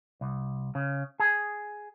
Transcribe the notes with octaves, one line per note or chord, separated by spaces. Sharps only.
C2
C#3
G#4